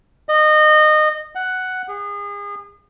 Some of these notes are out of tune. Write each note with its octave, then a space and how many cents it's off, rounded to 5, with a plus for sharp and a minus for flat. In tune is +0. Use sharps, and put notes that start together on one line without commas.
D#5 -25
F#5 +5
G#4 -35